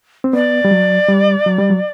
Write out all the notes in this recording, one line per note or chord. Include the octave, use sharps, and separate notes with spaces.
C4
B3 D5
G3
F#3
G3
F#3
G3
F#3